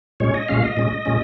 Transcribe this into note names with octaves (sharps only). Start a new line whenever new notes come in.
A#2 G#3 C#4 C#5
D#5
A#2 G#3 C#4 F5
D#5
A#2 G#3 C#4
A#2 G#3 C#4